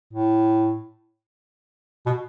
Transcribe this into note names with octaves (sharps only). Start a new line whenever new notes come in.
A2
B2